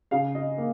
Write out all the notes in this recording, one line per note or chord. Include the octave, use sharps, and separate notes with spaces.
C#3 F5
D#5
A#3